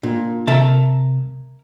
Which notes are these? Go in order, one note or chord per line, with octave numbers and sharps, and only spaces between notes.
A#2 D4
C3 A#4 E5 A5